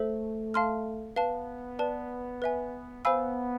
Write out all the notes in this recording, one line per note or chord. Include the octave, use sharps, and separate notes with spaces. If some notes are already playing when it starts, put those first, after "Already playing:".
Already playing: A3 A4 C5 E5
F5 A5 C6 F6
B3 B4 F5 A5
B4 D5 A5
B4 E5 G#5
B3 C5 F5 G#5 B5 E6